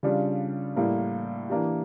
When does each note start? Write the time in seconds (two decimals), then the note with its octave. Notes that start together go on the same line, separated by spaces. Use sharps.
0.03 C#3 G3 D4 F4
0.76 A2 G3 A#3
1.50 E3 A#3 D4 G4